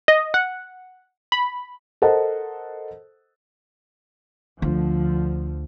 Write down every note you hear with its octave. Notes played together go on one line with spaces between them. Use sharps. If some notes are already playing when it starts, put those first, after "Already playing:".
D#5
F#5
B5
A4 A#4 C5 D#5 F#5 A5
D2 D3 F3